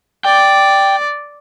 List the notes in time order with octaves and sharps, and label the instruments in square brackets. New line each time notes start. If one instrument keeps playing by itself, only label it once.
[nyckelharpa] D5 [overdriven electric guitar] G5